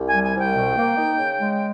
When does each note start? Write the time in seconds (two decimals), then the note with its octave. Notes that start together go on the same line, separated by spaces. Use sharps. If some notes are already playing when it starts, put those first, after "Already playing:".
Already playing: C2
0.09 G#5
0.14 G3
0.24 G#5
0.35 C2
0.41 G5
0.56 B2
0.77 A#3
0.98 D#4
1.19 C#3
1.40 G#3